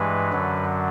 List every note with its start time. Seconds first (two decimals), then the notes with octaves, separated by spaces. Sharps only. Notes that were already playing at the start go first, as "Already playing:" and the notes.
Already playing: G2 E3 G#3 B4
0.32 F#2 D3 F#3